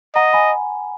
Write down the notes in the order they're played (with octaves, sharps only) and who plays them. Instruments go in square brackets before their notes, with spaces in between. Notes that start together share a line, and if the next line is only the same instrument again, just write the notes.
[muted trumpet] D#5 [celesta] F#5 A#5
[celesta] G#5 B5